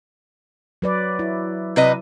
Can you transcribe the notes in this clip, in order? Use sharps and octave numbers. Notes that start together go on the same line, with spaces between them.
F#3 B4 D5
E4
C3 B4 D#5